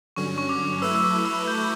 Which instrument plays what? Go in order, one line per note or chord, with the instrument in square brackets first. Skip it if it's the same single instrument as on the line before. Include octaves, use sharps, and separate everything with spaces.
[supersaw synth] G2 D3 F#3 C#4 [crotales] C#6
[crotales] C#6
D6
[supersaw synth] F#3 A3 E4 B4 [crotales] E6
[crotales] E6
D6
E6
G6